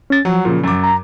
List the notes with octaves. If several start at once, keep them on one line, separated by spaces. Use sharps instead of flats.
C#4 A6
F3 F#3
A#2 C#3
F#2 D6
A#5